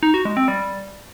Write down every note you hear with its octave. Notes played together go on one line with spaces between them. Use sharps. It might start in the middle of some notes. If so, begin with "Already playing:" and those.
D#4
F#4
G#3
C4
G3